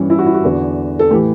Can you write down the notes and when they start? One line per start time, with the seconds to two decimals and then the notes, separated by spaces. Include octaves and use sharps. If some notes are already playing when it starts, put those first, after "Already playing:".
Already playing: G2 E3 C#4
0.10 E4
0.19 F#4
0.26 E4
0.34 F#4
0.44 E2 D3
0.99 A4
1.11 A2 E3 G4